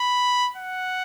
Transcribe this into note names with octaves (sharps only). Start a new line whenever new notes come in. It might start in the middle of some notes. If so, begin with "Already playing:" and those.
Already playing: B5
F#5